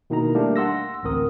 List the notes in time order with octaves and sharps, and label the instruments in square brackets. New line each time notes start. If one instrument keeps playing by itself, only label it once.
[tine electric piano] B2 D#3 A#3 D#4 E4 A#5
G3 A3 A#3 D4 G4
F#5 C6 E6 A#6
A1 D2 C4 A#4 D#6